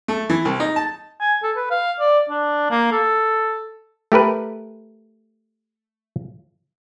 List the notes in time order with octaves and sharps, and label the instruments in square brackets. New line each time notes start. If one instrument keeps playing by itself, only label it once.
[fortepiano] A3
E3
C2
D#4
A5
[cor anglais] G#5
A4
B4
F5
D5
D4
A#3
A4
[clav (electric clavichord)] A3 G4 A#4 B4